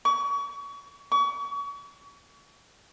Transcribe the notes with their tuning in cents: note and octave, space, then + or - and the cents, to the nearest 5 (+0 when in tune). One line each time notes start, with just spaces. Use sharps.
C#6 +30
C#6 +35